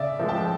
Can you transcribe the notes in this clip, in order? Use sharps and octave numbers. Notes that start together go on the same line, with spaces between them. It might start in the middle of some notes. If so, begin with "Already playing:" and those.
Already playing: C#3 D5 E5
F3 G#3
G5 A5